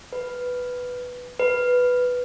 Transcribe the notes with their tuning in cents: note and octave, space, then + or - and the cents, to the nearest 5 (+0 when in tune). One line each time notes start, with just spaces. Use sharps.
B4 +0
B4 +0